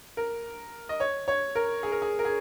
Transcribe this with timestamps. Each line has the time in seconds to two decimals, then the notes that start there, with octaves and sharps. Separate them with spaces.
0.17 A#4
0.89 D#5
1.00 C#5
1.28 C#5
1.55 A#4
1.83 G#4
1.92 A#4
2.02 G#4
2.19 A#4
2.25 G#4